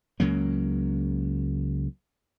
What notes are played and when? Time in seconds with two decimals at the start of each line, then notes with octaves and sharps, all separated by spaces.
0.20 C#2 C#3 F#3 A#3